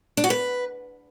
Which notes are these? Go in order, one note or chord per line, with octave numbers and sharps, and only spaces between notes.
D4
F#4
B4